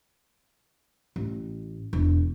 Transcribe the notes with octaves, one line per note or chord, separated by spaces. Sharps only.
A1
E1